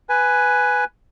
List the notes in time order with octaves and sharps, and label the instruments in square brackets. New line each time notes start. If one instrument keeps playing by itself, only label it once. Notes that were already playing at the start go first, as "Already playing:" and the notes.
[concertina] B4 G#5